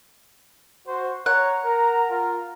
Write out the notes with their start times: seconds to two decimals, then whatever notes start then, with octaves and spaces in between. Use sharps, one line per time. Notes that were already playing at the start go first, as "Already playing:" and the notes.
0.87 F#4 C5
1.26 C#5 F#5 A#5
1.64 A#4 A#5
2.10 F4 A#4